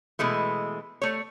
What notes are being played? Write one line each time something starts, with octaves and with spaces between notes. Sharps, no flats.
B2 E3 G#3 A3
A3 C#5